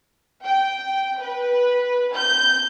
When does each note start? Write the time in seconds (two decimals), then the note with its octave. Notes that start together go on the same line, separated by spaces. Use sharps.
0.44 G5
1.22 B4
2.15 G6